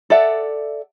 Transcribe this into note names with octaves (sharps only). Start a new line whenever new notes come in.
A4 D5 E5 F#5